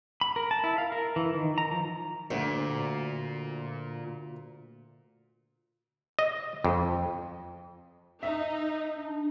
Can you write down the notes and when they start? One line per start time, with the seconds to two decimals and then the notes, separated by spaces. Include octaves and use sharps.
0.21 B5
0.36 A#4
0.51 A5
0.64 E4
0.78 F5
0.92 A#4
1.16 E3
1.35 D#3
1.58 A#5
1.71 F3
2.31 D2 A#2
6.19 D#5
6.64 F2
8.23 D#4 E5
8.96 D4